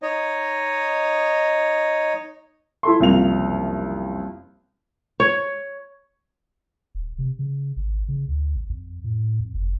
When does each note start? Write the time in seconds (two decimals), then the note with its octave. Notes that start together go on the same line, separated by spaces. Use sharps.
0.02 D#4 C#5 D#5
2.83 E4 A4 C6
2.99 F#1 C2 F2 F5 F7
5.20 C#5
6.95 D#1
7.19 C3
7.39 C#3
7.76 G#1
8.08 C#3
8.28 D2
8.56 A1
8.70 F2
9.04 A2
9.39 F2
9.54 F#1